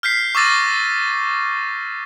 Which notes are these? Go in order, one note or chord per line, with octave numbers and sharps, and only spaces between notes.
F6 G6 B6 C7
C#6 D6 E6 A6 A#6 D#7